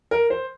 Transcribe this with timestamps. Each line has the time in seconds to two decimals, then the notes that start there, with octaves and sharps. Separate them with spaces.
0.11 A#4
0.30 C5